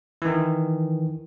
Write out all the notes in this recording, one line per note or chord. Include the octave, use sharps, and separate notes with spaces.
D#3 E3